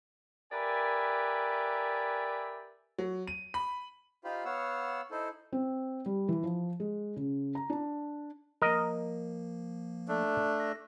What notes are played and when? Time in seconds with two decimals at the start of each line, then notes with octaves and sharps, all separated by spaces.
0.52 G4 A#4 B4 D5 E5 G#5
2.98 F#3
3.27 D#7
3.54 B5
4.24 D#4 F4 G4 C5 F5 B5
4.45 B3 C#5 F5 F#5 E6
5.11 D#4 E4 A4 C5
5.53 C4
6.06 G3
6.29 E3
6.44 F3
6.80 G#3
7.16 C#3
7.55 A#5
7.70 D4
8.62 F3 A#3 A#4 D#5
10.08 A3 D4
10.60 A#6